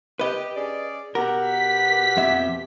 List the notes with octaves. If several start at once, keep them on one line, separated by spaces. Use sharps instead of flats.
G4 B4 D#5
C#4 G#4 D5
B2 G4 A#4 F#5
B6
F2 E5